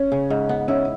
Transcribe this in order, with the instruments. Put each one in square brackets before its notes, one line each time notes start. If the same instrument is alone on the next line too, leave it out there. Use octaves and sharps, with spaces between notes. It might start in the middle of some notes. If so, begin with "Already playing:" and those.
Already playing: [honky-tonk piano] C#4
[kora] C#3
G#2
B3
[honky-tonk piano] C#4 [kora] E4